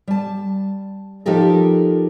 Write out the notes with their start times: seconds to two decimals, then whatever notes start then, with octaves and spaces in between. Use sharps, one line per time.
0.08 G3 A5
1.26 F3 D#4 G4 A4 A#4